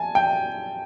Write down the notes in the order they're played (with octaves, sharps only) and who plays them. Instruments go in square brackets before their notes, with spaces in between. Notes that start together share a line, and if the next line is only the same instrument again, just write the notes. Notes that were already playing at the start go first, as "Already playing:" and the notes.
Already playing: [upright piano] G#5 A5
G5